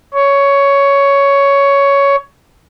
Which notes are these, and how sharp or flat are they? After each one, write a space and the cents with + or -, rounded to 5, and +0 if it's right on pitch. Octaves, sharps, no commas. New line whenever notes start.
C#5 +10